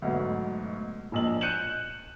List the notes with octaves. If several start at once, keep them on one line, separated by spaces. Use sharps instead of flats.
D2 G#2 B2 F#3
E1 A#1 D#5 F#7
F#6 G6 C#7 D#7 E7 F#7